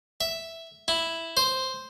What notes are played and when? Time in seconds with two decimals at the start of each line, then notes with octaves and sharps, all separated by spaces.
0.21 E5
0.88 E4
1.37 C5